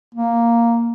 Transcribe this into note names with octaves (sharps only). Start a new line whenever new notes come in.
A#3